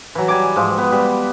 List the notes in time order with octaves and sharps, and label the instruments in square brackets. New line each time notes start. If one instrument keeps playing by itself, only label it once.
[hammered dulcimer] E3 F#3
G3 G#5 D6
G#2 F3
B3
G3